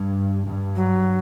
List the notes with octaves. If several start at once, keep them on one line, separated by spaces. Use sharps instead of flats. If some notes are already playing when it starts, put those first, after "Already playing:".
Already playing: G2
G2
F#3